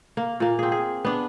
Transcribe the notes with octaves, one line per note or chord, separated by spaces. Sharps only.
A#3
A#2 A#3
C4 G#4
G#4
B3 D4